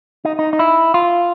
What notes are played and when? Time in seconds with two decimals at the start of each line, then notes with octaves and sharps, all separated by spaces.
0.25 D#4
0.39 D#4
0.53 D#4
0.59 E4
0.94 F4